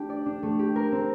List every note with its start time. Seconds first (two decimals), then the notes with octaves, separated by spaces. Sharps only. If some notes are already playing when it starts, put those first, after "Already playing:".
Already playing: A3 D4 G4
0.10 D5
0.26 D4
0.43 A3
0.59 G4
0.76 A#4
0.92 C4